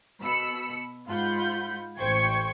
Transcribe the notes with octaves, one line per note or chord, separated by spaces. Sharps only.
B2 B5 E6 C#7
G#2 F4 F#5 B5 G6
A1 C5 G5 C#6 G#6 C#7